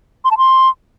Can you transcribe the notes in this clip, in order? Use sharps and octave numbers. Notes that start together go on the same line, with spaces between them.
C6
A5
C6